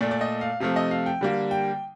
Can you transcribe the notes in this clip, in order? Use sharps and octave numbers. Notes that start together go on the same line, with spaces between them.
A#2 A3 D5
D5
D#5
F5
C3 F3 A3 F5
D#5
F5
G5
D3 G3 A#3
G5